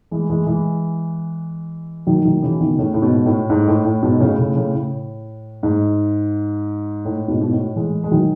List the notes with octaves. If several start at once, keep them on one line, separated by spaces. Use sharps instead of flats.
E3 G#3
E3 G#3
E3 G#3
D#3 F#3
D#3 F#3
C#3 E3
B2 D#3
A2 C#3
A2
G#2 B2
A2
G#2
A2
A2
G#2 B2
A2 C#3
A2 C#3
A2 C#3
A2
G#2
A2
G#2 B2
B2
A2
E3 G#3
G#3
D#3 F#3